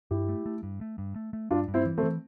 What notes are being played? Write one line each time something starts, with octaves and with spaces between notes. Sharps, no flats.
G2 E4 G4
A3
A3
G2
A3
G2
A3
A3
G2 D4 F4
G2
C4 E4
E3
A3 C4
E3